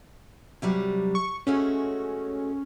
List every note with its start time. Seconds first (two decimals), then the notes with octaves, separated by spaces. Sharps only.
0.62 C3 F#3 G3
1.15 C#6
1.47 G#3 A3 C#4 F#4